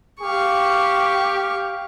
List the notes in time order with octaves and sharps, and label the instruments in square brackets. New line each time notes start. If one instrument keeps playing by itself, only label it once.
[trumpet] G4 [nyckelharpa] F5 C#6